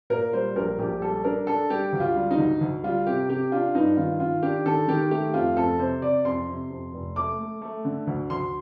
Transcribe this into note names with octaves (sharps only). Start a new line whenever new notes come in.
A#2 A#4
G3 C5
A#1 A#4
A#1 G4
G3 A4
D4 A#4
D4 A4
G3 G4
D2
F4
G3
D#4
D2
D2
G3 F4
C3 G4
C3 G4
D4 F4
G2 D#4
D#3 F4
D#3 F4
D4 G4
D#3 A4
D#3 G4
A3 G4
F2 F4
F2 A4
C3 C5
C3 D5
F2 C6
C3
F2
F1
A3 D6
A3
A3
D3
D2
D2 C6